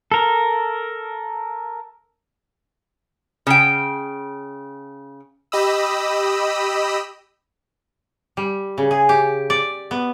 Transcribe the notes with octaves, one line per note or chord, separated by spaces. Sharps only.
A4 A#4
C#3 G5
G4 D#5 B5 D#6 E6
G3
C#3
G#4
G4
D5
B3